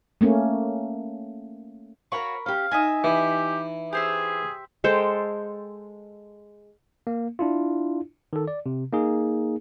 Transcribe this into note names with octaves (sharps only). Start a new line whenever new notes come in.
A3 A#3 C#4
F#4 A#4 C#5 F5 B5 C#6
C#4 G4 F5
D#4 D#5 E5 G#5
E3 G4
G4 G#4 C5 E5
G#3 A4 C5 G5
A#3
D4 E4 F4
D#3 A4
D5
C3
A#3 D#4 G#4